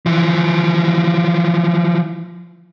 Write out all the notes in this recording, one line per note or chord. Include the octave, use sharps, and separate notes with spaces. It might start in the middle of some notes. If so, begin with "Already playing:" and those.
E3 F3